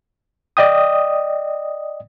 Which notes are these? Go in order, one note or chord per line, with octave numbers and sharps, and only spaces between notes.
D5 D#5 G5 D#6